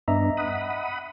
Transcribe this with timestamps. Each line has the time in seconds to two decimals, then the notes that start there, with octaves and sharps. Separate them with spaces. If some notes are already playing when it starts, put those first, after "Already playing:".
0.08 G2 B3 D4 D#5 E5 A#5
0.37 F#5 B5 D#6